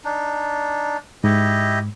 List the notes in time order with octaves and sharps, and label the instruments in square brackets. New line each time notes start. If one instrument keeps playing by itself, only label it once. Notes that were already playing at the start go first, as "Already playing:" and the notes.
[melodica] D4 D#4
[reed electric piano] G#2 [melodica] E4 G4 D#5